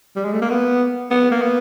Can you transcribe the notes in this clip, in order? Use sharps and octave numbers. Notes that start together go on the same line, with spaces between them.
G3
G#3
A3
A#3
B3
B3
A#3
B3